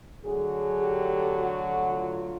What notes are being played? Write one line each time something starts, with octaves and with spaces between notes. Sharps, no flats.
D3 F#3 A3 G#4
G4
F#4
F4